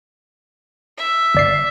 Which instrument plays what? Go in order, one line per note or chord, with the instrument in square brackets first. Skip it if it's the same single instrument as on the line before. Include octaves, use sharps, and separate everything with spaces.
[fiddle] E5
[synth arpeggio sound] G1 D5 C7